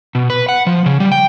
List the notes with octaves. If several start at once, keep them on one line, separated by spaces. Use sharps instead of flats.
B2
B4
F#5
F3
C#3
G3
G5